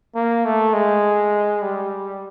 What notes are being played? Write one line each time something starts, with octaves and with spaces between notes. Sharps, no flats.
A#3
A3
G#3
G3